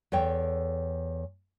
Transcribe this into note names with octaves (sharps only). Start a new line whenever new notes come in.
E2 A4 C#5 G5